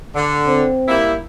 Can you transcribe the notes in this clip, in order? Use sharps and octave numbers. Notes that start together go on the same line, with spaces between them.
D3
C4
G3 A#3 E4